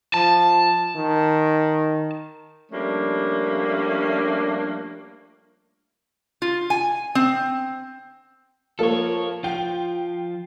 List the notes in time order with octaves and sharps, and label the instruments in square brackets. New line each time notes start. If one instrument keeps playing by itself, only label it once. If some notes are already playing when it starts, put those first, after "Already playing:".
[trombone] F3 [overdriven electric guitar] A5
[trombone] D#3
[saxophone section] F3 G3 A3 A#3 C#4 D4
[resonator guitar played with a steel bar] F4
G#5
C4
[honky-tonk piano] F3 A#3 [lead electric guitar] A4 C#5
[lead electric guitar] F3 F4 [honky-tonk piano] G5